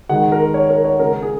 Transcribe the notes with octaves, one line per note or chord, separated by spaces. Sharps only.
D#3 G#3 F#5
A#4
C#5
A#4
C#5
C#3 G#3 A#4
G#4